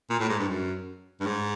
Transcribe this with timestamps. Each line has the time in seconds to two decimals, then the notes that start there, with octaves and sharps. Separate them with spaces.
0.10 A#2
0.19 A2
0.29 G#2
0.39 G2
0.48 F#2
1.20 G2
1.26 G#2